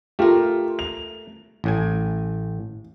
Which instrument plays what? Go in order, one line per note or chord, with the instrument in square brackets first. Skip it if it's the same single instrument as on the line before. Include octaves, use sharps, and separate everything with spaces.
[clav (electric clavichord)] A3 A#4 [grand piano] F4 G4
[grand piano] F7
[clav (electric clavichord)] A1 A2 G#5